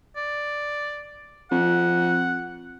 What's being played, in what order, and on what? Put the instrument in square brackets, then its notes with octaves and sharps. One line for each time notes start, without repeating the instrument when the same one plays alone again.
[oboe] D5
[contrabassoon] F2 [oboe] F#5